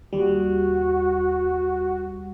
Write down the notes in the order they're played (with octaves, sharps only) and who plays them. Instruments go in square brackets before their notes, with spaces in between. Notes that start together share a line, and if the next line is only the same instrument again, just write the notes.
[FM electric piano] D#2 G3 [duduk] F#4